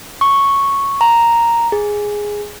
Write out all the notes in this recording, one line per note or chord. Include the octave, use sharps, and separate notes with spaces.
C#6
A#5
G#4